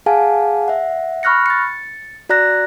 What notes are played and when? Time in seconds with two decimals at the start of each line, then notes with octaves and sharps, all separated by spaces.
0.06 G#4 F5 F#5 G#5 A5
0.68 E5 F#5
1.23 B5 C#6 F6 F#6 A#6 C#7
1.46 A6 C#7
2.30 F#4 D5 A#5 F#6 A#6